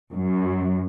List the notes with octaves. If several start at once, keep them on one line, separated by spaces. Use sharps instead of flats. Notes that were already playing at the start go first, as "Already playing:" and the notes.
F#2